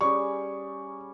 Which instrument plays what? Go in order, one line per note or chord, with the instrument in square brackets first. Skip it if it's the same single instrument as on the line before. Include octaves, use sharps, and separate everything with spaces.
[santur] G3 C#4 G#4 [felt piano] C#6